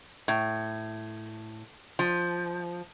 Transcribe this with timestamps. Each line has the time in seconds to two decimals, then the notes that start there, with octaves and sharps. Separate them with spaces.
0.28 A2
1.99 F3